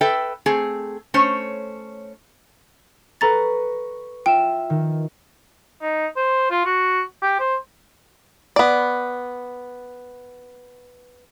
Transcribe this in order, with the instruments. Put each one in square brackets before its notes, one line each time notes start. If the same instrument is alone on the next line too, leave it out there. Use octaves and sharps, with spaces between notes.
[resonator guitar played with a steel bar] A4 B4 E5 G5
A3 C4 G#4
A3 C#4 C5 C#5
[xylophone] A4 A#5 A6 [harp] B4 C#6 A#6
[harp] F4 E5 E7 [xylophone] G5
[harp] D#3
[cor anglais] D#4
C5
F4
F#4
G4
C5
[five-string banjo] B3 D5